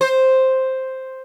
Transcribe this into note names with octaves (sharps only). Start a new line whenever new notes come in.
C5